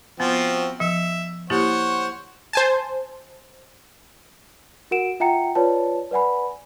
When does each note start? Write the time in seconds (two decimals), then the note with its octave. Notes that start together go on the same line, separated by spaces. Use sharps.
0.20 F3 B3 C4 F#4
0.80 F3 E5
1.50 A#3 E4 G4 C5 C#5 F#5
2.53 C5 G#5 A5
4.91 F#4 A#4 F#5 D7 E7
5.20 F4 E5 F#5 G5 A#5 C#7
5.55 F4 B4 C#5 D5 A5
6.11 B4 D5 F#5 G#5 B5